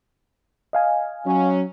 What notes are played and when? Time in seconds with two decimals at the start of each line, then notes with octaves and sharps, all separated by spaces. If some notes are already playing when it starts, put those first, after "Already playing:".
0.73 D#5 F5 G#5
1.26 F#3 C#4